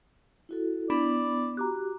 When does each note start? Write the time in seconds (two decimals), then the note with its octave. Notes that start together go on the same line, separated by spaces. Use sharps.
0.49 E4 F#4 A4
0.90 B3 D4 E4 D5 B5
1.57 F#4 G4 A#5 D6 F#6